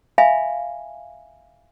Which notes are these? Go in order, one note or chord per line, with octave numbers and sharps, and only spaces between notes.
E5 F5 G#5 B5